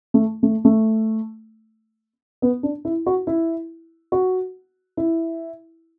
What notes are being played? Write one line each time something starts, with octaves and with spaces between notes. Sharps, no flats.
A3
A3
A3
B3
D4
E4
F#4
E4
F#4
E4